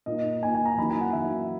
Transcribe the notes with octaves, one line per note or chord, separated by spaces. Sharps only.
A#2 A#3 D#4 D#5
A#2 A#3 D#4 G#5
G#5
A#5
F#2 E3 A#3 D#4 B5
G#5
F#5
F#2 E3 A#3 D#4 E5